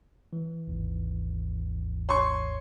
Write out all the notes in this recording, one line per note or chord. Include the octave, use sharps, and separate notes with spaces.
E3
G#1 D#2 G#2
C#5 C6 C#6